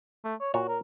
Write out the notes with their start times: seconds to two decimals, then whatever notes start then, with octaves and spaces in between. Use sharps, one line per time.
0.24 A3
0.41 C#5
0.54 A#2 F#4 C#5
0.68 A#4